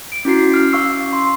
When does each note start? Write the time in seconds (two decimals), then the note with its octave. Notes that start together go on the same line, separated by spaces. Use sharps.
0.12 D7
0.25 C#4 E4 F#4 C7
0.54 F6
0.72 C#4 F5 C#6 E6 C7
1.13 C6